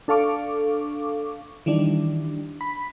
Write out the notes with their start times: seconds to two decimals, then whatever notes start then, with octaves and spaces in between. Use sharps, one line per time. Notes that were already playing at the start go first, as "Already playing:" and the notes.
0.08 D4 A4 F5 C#6 D6
1.66 D#3 E3 G3 D4
2.61 B5